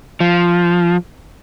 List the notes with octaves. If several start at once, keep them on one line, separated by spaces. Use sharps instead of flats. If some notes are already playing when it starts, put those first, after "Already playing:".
F3